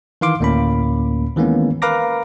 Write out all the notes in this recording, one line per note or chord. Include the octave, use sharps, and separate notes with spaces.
D#3 E3 F5 C6 D6
D2 A2 A#3 C#4 B5
D#3 E3 G#3 A#3 B3 C#4
A#4 B4 F5 A#5 D6 A#6